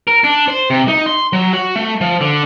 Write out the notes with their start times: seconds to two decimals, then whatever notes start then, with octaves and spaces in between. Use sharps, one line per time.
0.07 A#4
0.24 D4
0.48 C5
0.70 C3
0.88 D#4
1.06 C6
1.33 F#3
1.53 F#4
1.76 A3
2.01 F3
2.21 D3